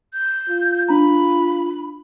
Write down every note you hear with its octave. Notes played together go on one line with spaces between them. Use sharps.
G6
F4
D4 A#5 B5